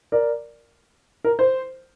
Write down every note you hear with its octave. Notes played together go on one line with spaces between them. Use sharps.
A#4 D5
A#4
C5